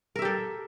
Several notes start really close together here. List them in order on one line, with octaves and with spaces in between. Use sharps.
A#4 E5 G4 A4